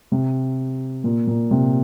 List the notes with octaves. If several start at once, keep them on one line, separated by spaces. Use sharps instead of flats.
C3
A#2
A#2
C3